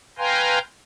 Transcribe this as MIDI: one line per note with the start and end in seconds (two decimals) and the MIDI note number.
0.18 0.59 71
0.18 0.59 77
0.18 0.59 79
0.18 0.59 80
0.18 0.59 82
0.18 0.59 84